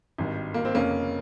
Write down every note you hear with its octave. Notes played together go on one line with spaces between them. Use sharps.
G#1 G2 D#3
A#3
C4
F1 F2 C#3 A#3 C#4